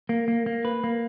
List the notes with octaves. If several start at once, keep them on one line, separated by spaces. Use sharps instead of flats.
A#3
A#3
A#3
B4
A#3